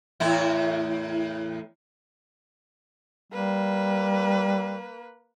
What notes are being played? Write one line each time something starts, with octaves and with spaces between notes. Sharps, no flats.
E2 A2 E4
G3 A#3 B4